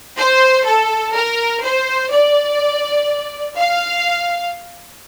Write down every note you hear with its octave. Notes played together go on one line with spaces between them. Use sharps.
C5
A4
A#4
C5
D5
F5